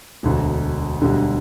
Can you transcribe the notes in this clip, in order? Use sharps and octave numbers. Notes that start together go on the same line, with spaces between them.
E1 D2 D3
E1 D2 D3 G3